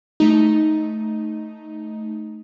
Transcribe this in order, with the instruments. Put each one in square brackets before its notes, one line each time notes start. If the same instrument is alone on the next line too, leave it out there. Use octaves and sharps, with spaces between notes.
[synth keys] A3 D#4